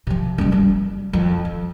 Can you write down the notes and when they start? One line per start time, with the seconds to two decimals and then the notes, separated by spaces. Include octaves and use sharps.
0.07 C3 F3
0.38 F#1 G3
0.52 G3
1.13 F2
1.45 F3